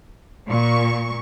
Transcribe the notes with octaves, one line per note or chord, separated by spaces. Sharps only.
A#2 C#6